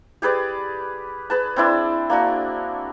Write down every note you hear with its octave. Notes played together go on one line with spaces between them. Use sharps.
G4 G#4 B4 D5
G#4 B4 A5
C4 D4 E4 D5
A#3 D4 F#4